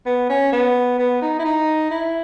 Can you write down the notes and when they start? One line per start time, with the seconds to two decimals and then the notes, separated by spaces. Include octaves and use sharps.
0.06 B3
0.29 C#4
0.53 B3
0.98 B3
1.22 D#4
1.39 E4
1.45 D#4
1.91 E4